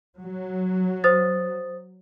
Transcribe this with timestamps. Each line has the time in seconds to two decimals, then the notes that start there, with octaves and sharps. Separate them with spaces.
0.18 F#3
1.04 C5 D#6 A6